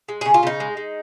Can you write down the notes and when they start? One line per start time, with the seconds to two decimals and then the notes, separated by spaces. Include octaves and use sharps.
0.09 G#3
0.21 C#3 G#4
0.34 F4
0.43 C#3 D#4
0.60 G#3
0.77 G#3